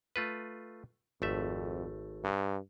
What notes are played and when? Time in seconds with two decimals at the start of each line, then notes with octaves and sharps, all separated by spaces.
0.16 A3 F4 B4
1.22 G#1 F2 A3 E5
2.24 G2